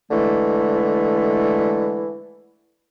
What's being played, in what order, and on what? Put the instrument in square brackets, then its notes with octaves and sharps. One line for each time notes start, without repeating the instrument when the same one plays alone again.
[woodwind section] D3 E3 G#3 A3